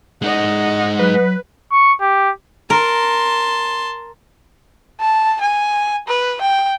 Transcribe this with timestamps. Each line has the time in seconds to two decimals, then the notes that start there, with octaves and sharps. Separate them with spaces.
0.22 G#3 D#4 D#5 F#5
0.99 F#3 B4
1.72 C#6
2.01 G4
2.70 A#4 A5 C6
5.00 A5
5.41 G#5
6.08 B4
6.41 G5